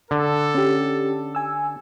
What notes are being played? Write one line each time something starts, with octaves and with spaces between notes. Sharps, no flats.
D3 A4
C#4 G4
G#5 E6